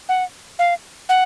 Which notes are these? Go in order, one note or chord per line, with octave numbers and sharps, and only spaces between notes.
F#5
F5
F#5